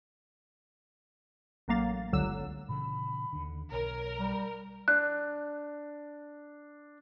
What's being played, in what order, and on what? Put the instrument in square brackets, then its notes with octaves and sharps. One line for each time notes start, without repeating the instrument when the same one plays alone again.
[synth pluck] A1 F#3 A#3 F5 A6
G1 C#2 D3 F#3 E6 E7
[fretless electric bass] A#2 C#3 E3 [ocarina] B5
[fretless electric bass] D#2 D3
[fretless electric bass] B1 [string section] A#4 [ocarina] C#5
[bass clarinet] G3 [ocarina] A#5
[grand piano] D4 [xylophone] F#6